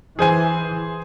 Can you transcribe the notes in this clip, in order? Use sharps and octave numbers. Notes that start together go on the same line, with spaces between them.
E3 G#4 C5 G#5